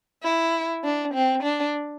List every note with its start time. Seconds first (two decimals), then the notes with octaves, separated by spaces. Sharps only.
0.23 E4
0.84 D4
1.14 C4
1.43 D4